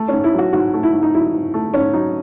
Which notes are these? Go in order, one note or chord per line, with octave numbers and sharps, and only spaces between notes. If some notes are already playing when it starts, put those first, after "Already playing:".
Already playing: A3
C#4
G#2
E4
F#3 F#4
G#2 F#4
A3
E4
G#2
D#4
F#3 E4
G#2
A3
G#2 C#4
F#3 D#4